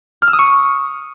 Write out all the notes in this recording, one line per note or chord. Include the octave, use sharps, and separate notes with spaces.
F6
E6
D#6
C#6